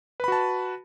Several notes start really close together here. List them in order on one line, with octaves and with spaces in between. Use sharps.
B4 B5 F#4 A5